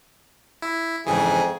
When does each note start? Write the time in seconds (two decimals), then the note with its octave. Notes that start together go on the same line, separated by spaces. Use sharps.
0.62 E4
1.07 F2 G#2 C#3 E3 G#4